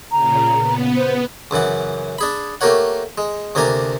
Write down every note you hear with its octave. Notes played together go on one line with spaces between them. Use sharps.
A#2 C#3 A#5
B3
C5
C#2 F#2 E3 F#5
D4 G#4 B5
A3 A#3 G4 A#4 C#5 F#5
G#3
D2 C3 A#3 D4 G#5 A#5